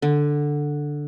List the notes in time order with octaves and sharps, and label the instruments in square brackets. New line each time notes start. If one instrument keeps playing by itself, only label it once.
[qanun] D3